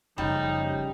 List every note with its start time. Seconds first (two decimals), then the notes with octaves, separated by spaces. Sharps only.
0.18 F#1 C#3 F3 G3 C#4 D#4